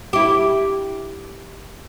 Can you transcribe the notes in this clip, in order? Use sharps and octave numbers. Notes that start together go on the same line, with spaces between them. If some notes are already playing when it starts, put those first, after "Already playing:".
E4 G4